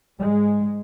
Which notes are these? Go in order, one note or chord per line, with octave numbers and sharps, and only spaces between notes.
G#2 G#3